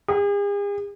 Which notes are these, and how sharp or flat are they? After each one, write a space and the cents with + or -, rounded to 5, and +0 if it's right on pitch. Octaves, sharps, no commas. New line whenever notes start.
G#4 -45